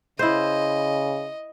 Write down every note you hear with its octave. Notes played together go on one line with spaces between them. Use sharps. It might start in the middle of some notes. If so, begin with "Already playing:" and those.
C#3 E4 C5 D#5